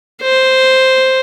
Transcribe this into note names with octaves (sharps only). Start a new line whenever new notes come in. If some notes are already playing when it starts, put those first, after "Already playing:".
C5